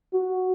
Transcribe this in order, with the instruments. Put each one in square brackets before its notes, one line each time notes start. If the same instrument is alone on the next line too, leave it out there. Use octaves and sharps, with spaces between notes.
[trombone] F#4